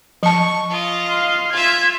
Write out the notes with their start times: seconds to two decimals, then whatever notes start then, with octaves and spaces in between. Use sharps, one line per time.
0.23 F3 A5 C#6
0.70 F4 D#5
1.07 F5 C6
1.52 F4 E5 G#6